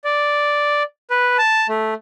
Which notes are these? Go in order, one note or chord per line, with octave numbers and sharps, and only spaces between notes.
D5
B4
A5
A3